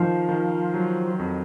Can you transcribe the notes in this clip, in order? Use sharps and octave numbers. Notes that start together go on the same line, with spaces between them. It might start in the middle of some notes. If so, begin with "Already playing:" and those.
Already playing: D#3 F3 D#4
D#3
F#3
F2